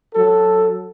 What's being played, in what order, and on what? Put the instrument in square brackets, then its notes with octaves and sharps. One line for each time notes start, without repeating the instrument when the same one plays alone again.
[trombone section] F#3 A4